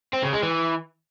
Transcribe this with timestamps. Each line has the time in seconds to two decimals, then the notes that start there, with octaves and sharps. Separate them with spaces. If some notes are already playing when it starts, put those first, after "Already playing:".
0.13 C4
0.23 C#3
0.33 G#3
0.43 E3